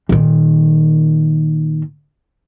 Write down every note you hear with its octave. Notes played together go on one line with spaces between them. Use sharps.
A#2 D#3